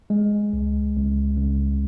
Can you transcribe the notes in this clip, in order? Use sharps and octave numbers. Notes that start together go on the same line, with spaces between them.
G#3
C#2
C#2
C#2